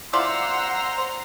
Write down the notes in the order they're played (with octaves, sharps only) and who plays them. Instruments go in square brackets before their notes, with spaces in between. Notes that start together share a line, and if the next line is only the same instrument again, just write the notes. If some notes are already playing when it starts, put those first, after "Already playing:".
[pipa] E4 F4 D5 [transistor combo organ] C5 [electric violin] F#5 E6 [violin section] A#5 C6